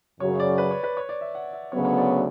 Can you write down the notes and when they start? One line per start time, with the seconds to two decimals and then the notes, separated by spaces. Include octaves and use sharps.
0.20 F#2 C#3 F#3 C#5
0.40 D5
0.58 B4
0.71 C#5
0.84 B4
0.97 C#5
1.09 D5
1.21 E5
1.35 F#5
1.53 E5
1.72 D2 C#3 F#3 B3 C#5
1.85 C#5
1.98 D5